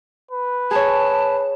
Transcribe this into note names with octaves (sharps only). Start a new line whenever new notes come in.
B4
G#4 C#5 A5